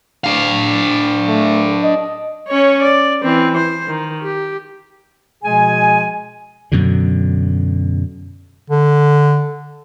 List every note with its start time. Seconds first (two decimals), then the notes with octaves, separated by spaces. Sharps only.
0.24 D4 F5
1.27 A3
1.83 D#5
2.48 C#4 C#5
2.82 D5
3.23 E3 C4
3.57 C5
3.88 D#3
4.21 G4
5.43 B2 F3 G#3 G#4 G#5
6.72 F#2 B2 D3
8.70 D3